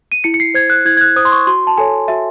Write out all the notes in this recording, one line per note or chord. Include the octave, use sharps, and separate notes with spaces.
D#7
E4 C#7
C#7
C7
C5 G#6
F#6
E4 G#6
G#6
F#6
C5 D#6
C6
C#6
F#4 C6
A5
A4 C#5 G#5
F#4 E5